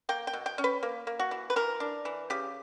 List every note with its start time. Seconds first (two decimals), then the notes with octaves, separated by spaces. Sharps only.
0.09 A#3 G5
0.27 G5
0.33 B2
0.46 G5
0.58 C#4
0.64 B4
0.83 A#3
1.07 A#3
1.19 F#4
1.31 E3
1.50 B4
1.56 E3 A#4
1.80 D4
2.05 E3
2.30 C#3 G4